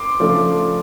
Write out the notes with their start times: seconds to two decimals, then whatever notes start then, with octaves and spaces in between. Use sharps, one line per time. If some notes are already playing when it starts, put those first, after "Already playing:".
Already playing: C6 D6
0.20 C#3 F3 A3 D4 F4